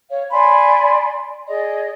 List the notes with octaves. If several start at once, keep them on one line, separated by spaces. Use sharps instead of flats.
C#5 F5
D5 G#5 B5 C6
G#4 D5 D#5